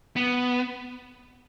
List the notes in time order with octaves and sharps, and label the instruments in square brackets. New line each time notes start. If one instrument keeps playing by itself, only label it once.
[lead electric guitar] B3